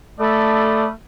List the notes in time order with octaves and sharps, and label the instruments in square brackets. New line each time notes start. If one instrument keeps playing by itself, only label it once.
[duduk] A3 [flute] A4 [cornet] D5 [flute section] B5 D#6 F6